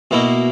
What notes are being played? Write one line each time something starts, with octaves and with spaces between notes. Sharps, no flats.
B2 A#3 E4